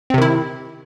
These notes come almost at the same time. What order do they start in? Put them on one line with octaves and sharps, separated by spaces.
C4 C3 D#3 E4